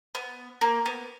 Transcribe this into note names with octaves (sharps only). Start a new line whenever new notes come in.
B3
A#3
B3